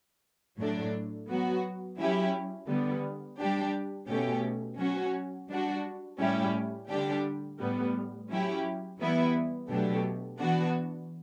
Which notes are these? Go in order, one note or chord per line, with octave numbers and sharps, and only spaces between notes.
A2 F#3 A3 D4
F#3 B3 F#4
F#3 C#4 E4 G4
D3 G3 B3
G3 D4 G4
B2 A3 C#4 G4
F#3 C#4 F#4
G3 D4 F#4
A2 G3 C#4 E4 G4
D3 G3 D4 G4
A2 G3 B3
F#3 C#4 E4 G4
E3 G3 B3 E4
B2 F#3 A3 D4 G4
E3 B3 D4 F#4